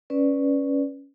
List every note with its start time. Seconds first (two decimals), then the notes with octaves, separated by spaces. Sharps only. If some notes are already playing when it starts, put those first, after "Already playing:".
0.10 C#4 B4 D5